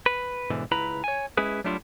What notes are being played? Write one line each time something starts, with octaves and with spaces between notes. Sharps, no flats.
B4
G#2 B2 D3 E3
C#2 E4 B4 A#5 B5
C#5 G#5
G#3 C#4 E4 G#4 B4
F#3 G3 A3 D4 E4 F4